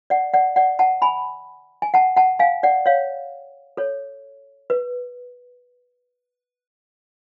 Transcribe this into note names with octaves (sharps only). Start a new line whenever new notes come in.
D5 F#5
D5 F#5
D5 F#5
F#5 A5
G#5 B5
G#5
F#5 A5
F#5 A5
F5 G#5
D5 F#5
C#5 F5
A4 C#5
B4